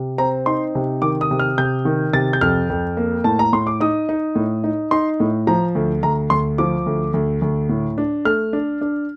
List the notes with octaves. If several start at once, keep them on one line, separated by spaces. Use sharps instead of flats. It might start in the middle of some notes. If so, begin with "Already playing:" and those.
Already playing: C3
C4 A#5
D#4 C6
C3
D#3 D6
D#6
C3
F6
C3 G6
D#3
C3 A6
G6
F2 F6
F2
A#3
A2 A5
A#5
A2 C6
D6
D#4 D#6
D#4
A2
D#4
D#4 C6
A2
F3 A#5
D2
D2 A#5
D2 C6
F3 D6
D2
D2
D2
A2
D4
A3 F6
D4
D4